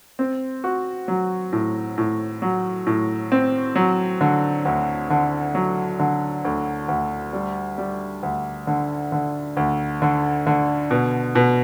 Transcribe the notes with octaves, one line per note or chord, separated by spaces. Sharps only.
C4
F#4
F#3
A2
A2
F#3
A2
C4
F#3
D3
D2
D3
F#3
D3
D2
D2
G3
G3
D2
D3
D3
D2
D3
D3
B2
B2